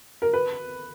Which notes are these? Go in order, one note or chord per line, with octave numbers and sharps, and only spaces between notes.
A#4
B4